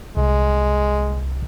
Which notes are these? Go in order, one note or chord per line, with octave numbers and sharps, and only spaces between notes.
C2 G#3